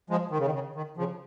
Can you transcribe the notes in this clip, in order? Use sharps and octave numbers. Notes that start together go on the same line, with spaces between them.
F3 G#3
D#3
C#3
D#3
C#3
D#3
C#3 F3